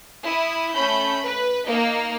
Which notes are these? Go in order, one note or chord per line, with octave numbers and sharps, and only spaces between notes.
E4 D#6
A3 C#4 B5 G6
B4
A#3 D#4